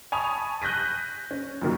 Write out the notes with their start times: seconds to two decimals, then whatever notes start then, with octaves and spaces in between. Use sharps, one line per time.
0.12 G#5 A5 B5 C#6 D#6 F7
0.62 F#6 G6 A#6 B6 D#7
1.31 C#4
1.62 F#2 A#2 D#3 F#3